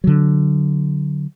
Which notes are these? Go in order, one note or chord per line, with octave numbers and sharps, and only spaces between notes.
D3 F#3